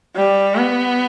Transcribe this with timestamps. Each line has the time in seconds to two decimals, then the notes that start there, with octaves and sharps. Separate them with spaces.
0.16 G3
0.56 B3